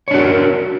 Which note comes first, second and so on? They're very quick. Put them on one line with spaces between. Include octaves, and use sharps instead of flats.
C#5 D4 F#4 A#4